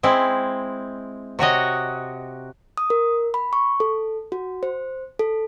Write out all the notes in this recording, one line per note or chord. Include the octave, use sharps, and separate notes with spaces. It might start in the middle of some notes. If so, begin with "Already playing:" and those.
G#3 C4 E4
C3 F#4 C#5 D#5
D#6
A#4
B5
C#6
A4
F#4
C5
A4